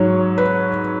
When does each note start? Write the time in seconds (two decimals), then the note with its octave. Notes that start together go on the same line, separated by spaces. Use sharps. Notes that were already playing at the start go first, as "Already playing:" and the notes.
Already playing: G#2 F#3 C#5
0.38 B4